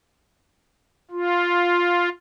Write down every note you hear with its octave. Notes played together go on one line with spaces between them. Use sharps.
F4